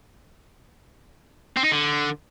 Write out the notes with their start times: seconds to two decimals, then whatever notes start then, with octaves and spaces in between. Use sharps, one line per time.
1.57 C4
1.64 D#4
1.72 D3